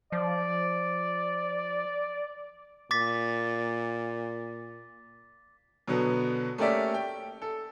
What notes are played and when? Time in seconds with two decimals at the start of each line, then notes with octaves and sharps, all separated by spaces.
0.12 F3 D5
2.91 A#2 D6 A6 B6
5.88 B2 D3 F#3 B3
6.58 A3 A#3 C#4 G4 D5 E5
6.94 G5
7.42 A4